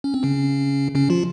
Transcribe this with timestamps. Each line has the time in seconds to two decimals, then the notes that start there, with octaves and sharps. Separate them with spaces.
0.04 C#4
0.14 C4
0.23 C#3 C#4
0.95 C#3 C#4
1.10 F3 F4